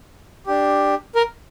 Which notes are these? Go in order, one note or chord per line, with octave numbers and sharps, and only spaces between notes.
D4 G4
A#4